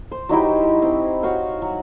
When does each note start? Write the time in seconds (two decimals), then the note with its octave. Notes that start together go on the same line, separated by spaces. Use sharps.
0.11 C5
0.29 F#3 D#4 E4 G4
0.82 C4
1.23 F#4 C#5 F5 G5
1.62 F#3